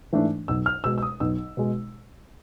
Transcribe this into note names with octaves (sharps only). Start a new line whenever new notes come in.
G#2 E3 A3 D4
B1 E6
F6
B2 G#3 E6
E6
D#6
B1 E6
B2 G#3